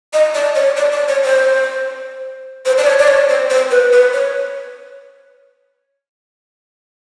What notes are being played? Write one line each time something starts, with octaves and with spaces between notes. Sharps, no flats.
D#5
D5
C#5
D5
D5
C#5
C5
C5
D5
C#5
D5
C#5
C5
C5
B4
B4
C#5